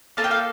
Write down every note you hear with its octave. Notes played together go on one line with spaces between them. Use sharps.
A#3 F4 A4 A5
G5
F5